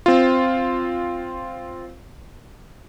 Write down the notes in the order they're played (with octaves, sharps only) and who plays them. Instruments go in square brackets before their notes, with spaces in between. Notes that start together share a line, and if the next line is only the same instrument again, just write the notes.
[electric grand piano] C4 F4